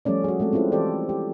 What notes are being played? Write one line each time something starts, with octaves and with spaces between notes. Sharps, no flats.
F3 G3 A3 C#4 D5
F#4 G#4
G#3 A3 C4 A4
C4 C#4 E4 F4 B4
E3 G4 A4 C5 D5
G4